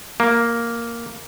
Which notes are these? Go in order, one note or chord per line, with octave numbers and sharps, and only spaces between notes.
A#3